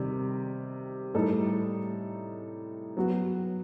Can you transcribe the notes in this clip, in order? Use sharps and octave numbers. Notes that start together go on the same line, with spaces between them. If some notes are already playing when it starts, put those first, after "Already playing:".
Already playing: C3 D#3 G3
A2 G3 D#4 A4
F#3 B3 F#4